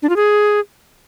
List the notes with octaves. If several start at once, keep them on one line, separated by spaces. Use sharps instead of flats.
D4
F4
G#4